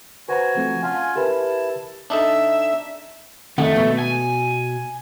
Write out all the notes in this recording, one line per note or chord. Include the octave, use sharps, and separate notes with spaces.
F#4 B4 C5 G#5 A#5
F3 A3 C4
C#4 F4 F5 F#5 G#5 A5
E4 G4 A#4 B4 A5
D4 D#4 A4 E5
F2 D#3 A3 F#5
B2
G#5